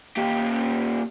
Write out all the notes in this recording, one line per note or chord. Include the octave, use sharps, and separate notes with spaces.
A#2 G4